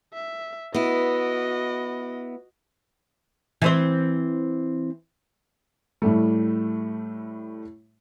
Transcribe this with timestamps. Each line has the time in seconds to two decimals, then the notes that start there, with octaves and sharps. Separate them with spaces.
0.14 E5
0.74 B3 E4 F#4 D#5
3.62 E3 C4 C5
6.02 A2 G3 A3